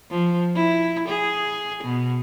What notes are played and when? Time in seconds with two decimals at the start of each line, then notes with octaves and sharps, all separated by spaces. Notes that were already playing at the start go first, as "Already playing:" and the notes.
0.11 F3
0.55 E4
1.09 G#4
1.84 B2